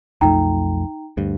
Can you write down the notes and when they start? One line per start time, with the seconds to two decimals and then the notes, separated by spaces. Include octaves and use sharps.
0.21 B1 F2 A3 D#4 G5 A#5
1.17 D2 G2